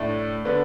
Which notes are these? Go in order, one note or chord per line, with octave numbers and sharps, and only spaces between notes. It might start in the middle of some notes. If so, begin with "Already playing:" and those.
Already playing: A2 A3 D4
D3 B3 D4